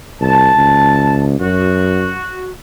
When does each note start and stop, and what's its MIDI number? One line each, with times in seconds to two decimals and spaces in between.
0.21 0.52 36
0.21 1.25 81
0.56 1.39 37
1.40 2.17 42
1.40 2.51 66